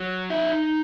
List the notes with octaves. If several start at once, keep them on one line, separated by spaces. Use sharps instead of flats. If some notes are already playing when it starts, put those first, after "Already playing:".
Already playing: F#3
D#4 E5